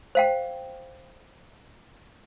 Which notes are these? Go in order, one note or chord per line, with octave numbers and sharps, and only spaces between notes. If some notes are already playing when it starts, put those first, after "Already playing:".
C5 F5 G5